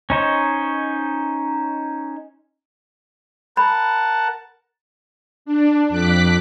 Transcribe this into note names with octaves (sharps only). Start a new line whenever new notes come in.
C#4 D#4 C5 C#5
A#4 F#5 A5 B5
D4
F2 D6 F#6 B6